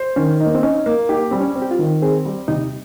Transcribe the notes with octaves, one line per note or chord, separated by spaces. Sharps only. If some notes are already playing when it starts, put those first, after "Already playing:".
Already playing: C5
D#3 C#4
D#4
A#3
C4
C#4 D#4
A#3
D#4 G4
G3 C4
C#4
C4
G4
F4
D#3
C4 G#4
G3
C3 D#4